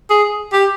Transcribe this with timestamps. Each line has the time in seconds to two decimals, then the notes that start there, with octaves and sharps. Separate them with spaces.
0.10 G#4
0.53 G4